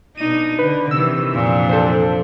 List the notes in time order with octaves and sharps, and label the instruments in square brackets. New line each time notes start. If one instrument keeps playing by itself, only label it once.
[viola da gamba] B2 D4 D#4 [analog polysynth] D#7
[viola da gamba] D3 [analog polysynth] B4
[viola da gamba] C3 D#3 E3 [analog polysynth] E6
[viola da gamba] F2 D4 [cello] A#2
[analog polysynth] A4 C5